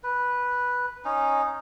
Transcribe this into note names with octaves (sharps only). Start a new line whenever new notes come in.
B4
C#4 D#4